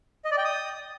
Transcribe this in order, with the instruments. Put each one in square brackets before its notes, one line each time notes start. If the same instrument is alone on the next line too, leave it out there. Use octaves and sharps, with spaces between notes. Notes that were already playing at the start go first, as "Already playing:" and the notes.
[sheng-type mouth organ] D#5
D5
G5
D#6